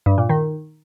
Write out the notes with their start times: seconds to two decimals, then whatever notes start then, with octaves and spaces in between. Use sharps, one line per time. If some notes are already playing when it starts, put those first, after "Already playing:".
0.06 G2
0.18 A#2
0.29 D#3